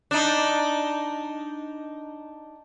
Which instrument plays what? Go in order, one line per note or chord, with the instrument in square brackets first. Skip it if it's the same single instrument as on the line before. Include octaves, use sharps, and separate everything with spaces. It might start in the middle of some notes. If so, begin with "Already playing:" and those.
[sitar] D4 D#4